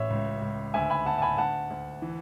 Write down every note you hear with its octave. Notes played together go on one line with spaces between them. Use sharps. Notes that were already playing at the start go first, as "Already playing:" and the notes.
Already playing: A1 C#5 E5
C#2
C#2
D2 E5 G#5
G#5 B5
D2 F#5 A5
A5
G#5 B5
D2 F#5 A5
D2
E3